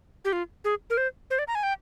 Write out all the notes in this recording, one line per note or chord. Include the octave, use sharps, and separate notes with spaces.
G4
F4
G#4
A#4
C5
C5
D5
A#5
G#5
G5